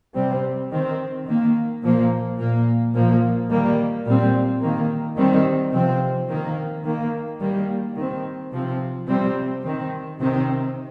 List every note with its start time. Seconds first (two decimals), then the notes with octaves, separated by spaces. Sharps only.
0.15 C3 G3 C4
0.71 D#3 C4
1.27 D#3 A#3
1.83 A#2 F3 A#3
2.38 A#2 A#3
2.94 A#2 F3 A#3
3.50 D#3 G3 A#3
4.05 A#2 G3 C4
4.61 D#3 A#3
5.17 D#3 G3 C4
5.73 C3 F3 C4
6.29 D#3 A#3
6.84 D#3 A#3
7.40 D#3 G3 A#3
7.96 D#3 C4
8.52 C3 F3 C4
9.08 C3 G3 C4
9.63 D#3 C4
10.19 C3 D#3 C4